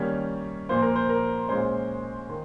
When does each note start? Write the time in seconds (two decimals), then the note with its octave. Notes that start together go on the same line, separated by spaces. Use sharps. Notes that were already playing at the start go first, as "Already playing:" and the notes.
Already playing: D#3 G3 A#3 C#4
0.69 A#2 F3 A#3 C5
0.82 A#4
0.96 C5
1.09 A#4
1.49 A#2 G#3 C#4 C5
2.29 D#3